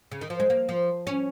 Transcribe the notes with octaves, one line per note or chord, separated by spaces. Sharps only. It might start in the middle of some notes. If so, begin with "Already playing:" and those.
C#3
D#3
F3
G#3
A#3
F3
C#4